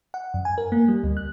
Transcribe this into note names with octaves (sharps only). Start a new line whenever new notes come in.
F#5
F#2
G#5
A#4
A#3
G3
D2
F#6